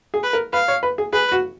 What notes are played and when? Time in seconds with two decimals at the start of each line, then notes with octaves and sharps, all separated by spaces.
0.14 G#4
0.23 B4
0.33 A#4
0.53 B4 F5
0.68 C#5
0.83 B4
0.98 G#4
1.13 G#4 B4
1.32 F#4